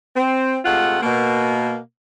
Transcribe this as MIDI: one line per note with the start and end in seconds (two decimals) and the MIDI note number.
0.16 0.58 60
0.65 0.98 48
0.65 0.98 56
0.65 0.98 57
0.65 0.98 65
0.65 0.98 78
1.03 1.77 47
1.03 1.77 58